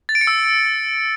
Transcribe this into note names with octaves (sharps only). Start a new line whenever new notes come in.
A6
D7
C#7
E6